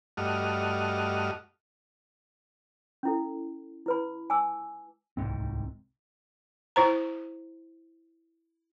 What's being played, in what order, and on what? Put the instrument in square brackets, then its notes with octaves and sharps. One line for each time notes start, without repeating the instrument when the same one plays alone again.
[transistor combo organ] G2 A3 F#4 D#5 F6
[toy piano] C#4 E4 A4
E4 B4 B5
G#5 A5 D6 E6
[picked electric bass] D1 C2 G#2 C4
[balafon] E4 C5 A#5